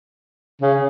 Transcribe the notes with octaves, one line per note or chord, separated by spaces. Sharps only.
C#3